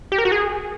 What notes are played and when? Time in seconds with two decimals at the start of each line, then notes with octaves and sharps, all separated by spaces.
0.12 G4
0.18 A#4
0.25 F#4
0.32 G#4